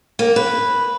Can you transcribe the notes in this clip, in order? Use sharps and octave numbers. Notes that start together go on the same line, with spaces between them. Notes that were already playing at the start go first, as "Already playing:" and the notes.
A#3
B4